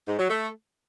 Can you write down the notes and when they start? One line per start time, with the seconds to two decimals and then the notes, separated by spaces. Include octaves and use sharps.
0.08 G#2
0.19 F#3
0.30 A3